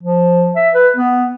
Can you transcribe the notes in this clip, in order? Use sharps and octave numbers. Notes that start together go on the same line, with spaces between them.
F3
E5
B4
B3